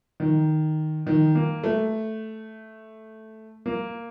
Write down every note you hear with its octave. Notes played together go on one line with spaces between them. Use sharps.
D#3
D#3
A#3
A3
A#3